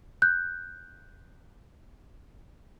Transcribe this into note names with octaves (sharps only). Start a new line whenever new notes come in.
F#6 G6